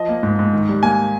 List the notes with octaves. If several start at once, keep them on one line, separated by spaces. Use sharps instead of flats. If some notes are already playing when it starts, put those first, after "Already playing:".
Already playing: F3 D#5
A#3
G#2
G#2
D#3
G3
A#3 G#5